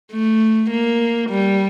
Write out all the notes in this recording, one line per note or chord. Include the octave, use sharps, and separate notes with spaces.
A3
A#3
G3